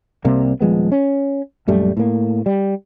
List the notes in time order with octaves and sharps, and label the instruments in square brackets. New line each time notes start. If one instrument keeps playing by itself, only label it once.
[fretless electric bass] C2 C3 G3 A#3
D#1 F3 G#3 B3
C#4
A#1 F#2 G3 A3
A2 A#3
G3